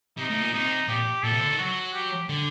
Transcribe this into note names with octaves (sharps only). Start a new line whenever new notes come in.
C3 D#4
A2
A#2
C3 D#4
A#2 G4
A#2 A4
C3
D3
D#3
F#3 F#4
G4
D3